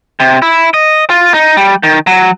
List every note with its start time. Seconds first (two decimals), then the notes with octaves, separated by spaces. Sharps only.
0.20 C3
0.42 E4
0.74 D#5
1.10 F4
1.34 D#4
1.57 G3
1.83 D#3
2.07 F#3